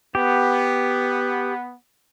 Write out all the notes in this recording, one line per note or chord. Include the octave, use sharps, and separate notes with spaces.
B3 G4